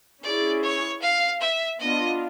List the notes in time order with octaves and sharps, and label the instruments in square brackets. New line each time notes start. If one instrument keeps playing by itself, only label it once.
[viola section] C#4 E4 G#4 [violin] D5
[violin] C#5
F5
E5
[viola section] B3 D4 F4 [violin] D#5